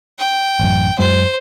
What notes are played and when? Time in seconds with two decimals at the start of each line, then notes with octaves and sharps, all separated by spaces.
0.19 G5
0.60 A1 F#2
0.99 F#2 F#3 G#3 C5